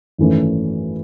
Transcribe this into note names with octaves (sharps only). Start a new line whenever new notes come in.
G#1 F#2 E3 A3 C#4